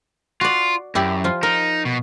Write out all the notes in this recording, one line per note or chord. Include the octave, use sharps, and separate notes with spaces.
F4 F#4 D5
F#2 E4 G4 D5
F3 F4
D#4 A#4
B2